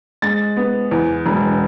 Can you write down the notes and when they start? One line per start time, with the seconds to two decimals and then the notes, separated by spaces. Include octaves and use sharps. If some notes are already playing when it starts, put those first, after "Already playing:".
0.22 G#3 A6
0.57 B3
0.91 E2
1.26 E1